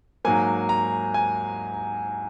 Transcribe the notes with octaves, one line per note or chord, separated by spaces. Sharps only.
G#2 F#3 A#3 G#5
A#5
G#5